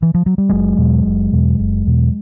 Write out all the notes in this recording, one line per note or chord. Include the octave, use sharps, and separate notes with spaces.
E3
F3
F#3
G3
F#1 F#3 G#3
E2 B2
F#1
E2 B2
F#1
E2 B2